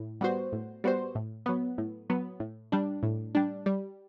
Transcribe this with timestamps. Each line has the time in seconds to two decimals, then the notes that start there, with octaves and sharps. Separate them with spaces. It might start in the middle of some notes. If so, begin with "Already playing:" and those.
Already playing: A2
0.21 G3 B3 F#4 C5
0.53 A2
0.84 G3 B3 F#4 C5
1.15 A2
1.46 F#3 B3
1.78 A2
2.10 F#3 B3
2.40 A2
2.72 G3 D4
3.03 A2
3.35 G3 D4
3.66 G3